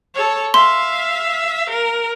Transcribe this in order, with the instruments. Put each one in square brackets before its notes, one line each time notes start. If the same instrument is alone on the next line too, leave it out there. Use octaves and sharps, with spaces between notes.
[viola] A4 C#5
[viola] E5 F5 [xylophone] C6
[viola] A#4